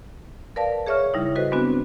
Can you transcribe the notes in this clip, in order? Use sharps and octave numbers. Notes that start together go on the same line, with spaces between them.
A#4 B4 D5 F5 A5
G#4 C#5 E5 C#6 F6
C#3 G3 D#4 E4
F#4 A4 B4 C5 D#5
G#3 B3 C4 D4 F#4